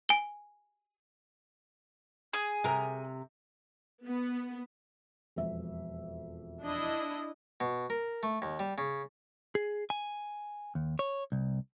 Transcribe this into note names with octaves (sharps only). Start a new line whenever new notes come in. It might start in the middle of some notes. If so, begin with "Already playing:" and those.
G#5 G7
G#4
C3 A#4
B3
E1 F2 E5
D4 E4 D#5
B2
A#4
A3
D#2
G3
C#3
G#4
G#5
D#2
C#5
C2